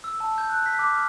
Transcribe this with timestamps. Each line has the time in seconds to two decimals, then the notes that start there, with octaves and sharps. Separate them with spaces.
0.04 E6
0.20 A5
0.38 G6
0.49 F#6
0.66 B6
0.79 D6
0.92 F6